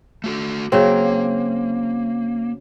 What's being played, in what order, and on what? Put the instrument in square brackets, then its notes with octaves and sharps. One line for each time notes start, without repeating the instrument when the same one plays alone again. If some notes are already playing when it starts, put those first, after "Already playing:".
[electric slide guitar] A3 F#4 A4
[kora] C#3 F#3 C4 [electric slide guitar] A#3